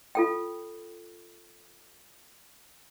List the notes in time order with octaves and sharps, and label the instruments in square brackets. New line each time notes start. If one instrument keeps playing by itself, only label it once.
[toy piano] F4 A4 G5